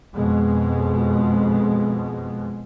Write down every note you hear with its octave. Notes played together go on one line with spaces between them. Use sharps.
F2 B2 G#3